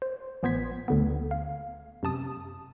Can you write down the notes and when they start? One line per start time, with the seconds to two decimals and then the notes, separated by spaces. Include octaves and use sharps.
0.02 C5
0.43 A1 F3 B3 C5 G#6 B6
0.88 D2 D3 B3
1.31 F5
2.03 F#2 C3 A5 D#6